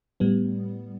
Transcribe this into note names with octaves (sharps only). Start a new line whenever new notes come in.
A2 G3 B3